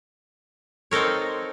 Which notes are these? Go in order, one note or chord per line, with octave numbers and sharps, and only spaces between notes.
C4 D#4 A4 A#4 C#5